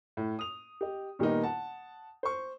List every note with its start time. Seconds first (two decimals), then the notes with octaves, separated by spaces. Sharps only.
0.17 A2
0.39 D#6 F7
0.81 G4 D#5
1.19 A#2 D#3 G3 A#3 B3 D#4
1.44 F#5 A5
2.23 C5 C#6